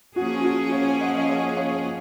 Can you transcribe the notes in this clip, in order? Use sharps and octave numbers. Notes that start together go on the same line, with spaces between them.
F3 A#3 C#4 F#4 G#4
F#4
C#5 F5
D#5 F#5
D#5
C#5 F5
C#5 F5